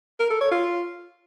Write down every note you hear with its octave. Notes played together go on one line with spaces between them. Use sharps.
A#4
A4
C#5
F4